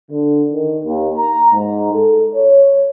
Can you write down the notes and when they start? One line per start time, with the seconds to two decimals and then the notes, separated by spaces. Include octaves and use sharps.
0.11 D3
0.53 D#3
0.85 D#2
1.17 A#5
1.52 G#2
1.92 A4
2.35 C#5